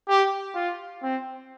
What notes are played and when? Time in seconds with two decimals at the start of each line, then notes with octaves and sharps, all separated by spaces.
0.08 G4
0.55 F4
1.03 C4